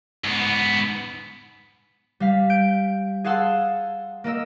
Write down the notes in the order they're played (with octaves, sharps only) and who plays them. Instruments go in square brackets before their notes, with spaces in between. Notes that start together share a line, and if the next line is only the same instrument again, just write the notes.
[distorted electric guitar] G#2 B3
[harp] G3 F5 B6
G6 D7
G#4 F5 F#5 A5 C6 E6
A#3 A#4 D#5 E6